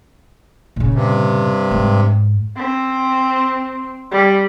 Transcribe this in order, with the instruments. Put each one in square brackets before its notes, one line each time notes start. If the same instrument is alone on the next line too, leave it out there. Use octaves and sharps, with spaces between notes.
[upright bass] A#2 C#3
[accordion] G2 C3
[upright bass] G#2
[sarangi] C4
G3